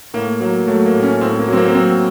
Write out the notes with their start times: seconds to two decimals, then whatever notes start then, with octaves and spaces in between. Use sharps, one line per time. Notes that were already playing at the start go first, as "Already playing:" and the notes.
0.14 A2 A#3
0.40 F#3 A#3
0.67 F#3 A3
0.86 A#3
0.94 A2
1.03 C#4
1.21 A2 C4
1.39 A#3
1.48 F#3 C4
1.57 A#3
1.68 A#3
1.75 F#3 C4